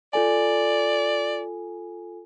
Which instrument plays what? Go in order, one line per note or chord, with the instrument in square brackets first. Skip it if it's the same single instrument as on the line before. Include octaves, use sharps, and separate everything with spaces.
[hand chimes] F4 A4 G#5 [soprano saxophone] D5